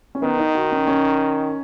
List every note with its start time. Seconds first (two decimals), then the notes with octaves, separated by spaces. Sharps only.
0.15 C#4
0.22 D#3 B3
0.39 D#4
0.55 F#4
0.72 C#4
0.87 C#4